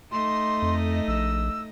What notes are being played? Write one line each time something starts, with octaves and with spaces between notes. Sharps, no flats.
A3 D#4 D#5 C6
F2
A#1 E6